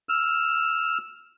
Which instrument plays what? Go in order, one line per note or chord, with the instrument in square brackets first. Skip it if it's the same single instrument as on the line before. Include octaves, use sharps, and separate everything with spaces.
[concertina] E6 F6